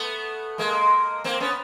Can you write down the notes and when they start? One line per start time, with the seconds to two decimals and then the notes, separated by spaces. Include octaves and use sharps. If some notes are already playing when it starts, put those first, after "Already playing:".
Already playing: A3 B3
0.58 G#3 A#3
1.24 A#3 C4
1.40 B3 C#4